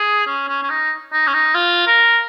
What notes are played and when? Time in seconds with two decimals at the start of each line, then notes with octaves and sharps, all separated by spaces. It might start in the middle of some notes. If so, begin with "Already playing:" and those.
Already playing: G#4
0.27 C#4
0.48 C#4
0.63 C#4
0.70 D#4
1.12 D#4
1.27 C#4
1.34 D#4
1.55 F4
1.87 A#4